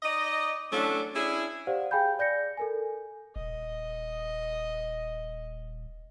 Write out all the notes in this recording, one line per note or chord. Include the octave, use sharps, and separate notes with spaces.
D#4 D5 D#5
E3 F#3 A3 C#4 D4
C#4 D4 E4 G#4
G4 C5 D5 F5 F#5
G#4 F5 G5 G#5 B5 G6
D5 G6 A#6 C#7
A4 A#4 G#5
D#1 D#5